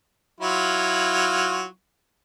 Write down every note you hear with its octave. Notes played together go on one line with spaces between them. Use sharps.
F#3 E4 F4